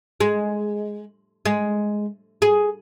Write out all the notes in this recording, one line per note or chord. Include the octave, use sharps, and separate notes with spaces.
G#3
G#3
G#4